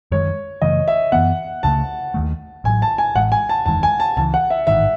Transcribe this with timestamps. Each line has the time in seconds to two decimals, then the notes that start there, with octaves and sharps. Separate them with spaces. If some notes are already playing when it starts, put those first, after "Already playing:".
0.11 F#2 D#3 G#3 C#5
0.62 F#2 C#3 E3 A3 D#5
0.88 E5
1.12 F#2 E3 B3 F#5
1.63 C#2 C#3 E3 A3 A5
2.14 D#2 D#3 A3
2.64 A1 A2 F#3 G#5
2.82 A5
2.98 G#5
3.15 A1 A2 G#3 F#5
3.32 G#5
3.49 A5
3.66 F#1 E2 D#3 G#3 A5
3.83 G#5
4.00 A5
4.17 C#2 C#3 E3 A5
4.34 F#5
4.50 E5
4.67 A1 G#2 D#3 E5